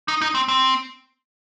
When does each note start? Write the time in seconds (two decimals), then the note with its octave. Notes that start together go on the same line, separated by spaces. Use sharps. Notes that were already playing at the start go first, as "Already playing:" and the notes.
0.08 D#4
0.22 D#4
0.35 C4
0.48 C4